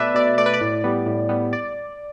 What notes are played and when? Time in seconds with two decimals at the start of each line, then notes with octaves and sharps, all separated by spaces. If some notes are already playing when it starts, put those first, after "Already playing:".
Already playing: B2 A3 B4 D5 E5
0.15 B2 D5
0.38 A3 D5
0.46 B4
0.53 D5
0.61 A2
0.84 G3 B3
1.06 A2
1.29 G3 B3
1.53 D5